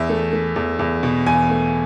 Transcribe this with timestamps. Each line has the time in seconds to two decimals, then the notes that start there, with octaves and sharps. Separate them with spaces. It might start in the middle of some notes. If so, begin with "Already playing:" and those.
Already playing: E2 E5
0.09 A3
0.33 A3
0.56 E2
0.79 E2
1.03 B2
1.27 E2 G#5
1.50 A3